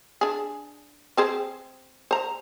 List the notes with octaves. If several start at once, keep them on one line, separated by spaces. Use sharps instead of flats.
D4 G#4
C4 G#4 C5
C5 A#5